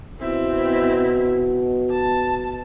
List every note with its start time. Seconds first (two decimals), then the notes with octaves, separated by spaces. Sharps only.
0.20 B2 C4 E4
1.91 A5